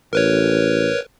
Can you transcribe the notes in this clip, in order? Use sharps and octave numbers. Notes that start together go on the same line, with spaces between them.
A1 A#4 B4 C#5